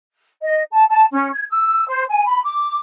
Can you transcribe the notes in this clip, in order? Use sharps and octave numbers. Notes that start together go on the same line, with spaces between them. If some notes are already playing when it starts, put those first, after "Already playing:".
D#5
A5
A5
C#4
G#6
E6
C5
G#5
B5
D6